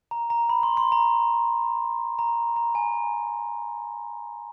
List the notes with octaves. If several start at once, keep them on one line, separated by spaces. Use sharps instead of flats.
A#5
A#5
B5
C6
C6
A#5
A#5
A#5
G#5